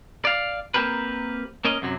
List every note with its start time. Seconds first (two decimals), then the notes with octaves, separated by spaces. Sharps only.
0.25 D5 F5
0.74 A#3 C4 D4 G4 A#4 B4
1.65 A#3 C#4 A#4 D#5
1.82 F#2 C3 F#3